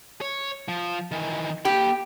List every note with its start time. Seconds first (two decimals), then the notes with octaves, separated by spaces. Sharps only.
0.21 C#5
0.68 F3
1.11 D#3 E3
1.65 A#3 G4 B5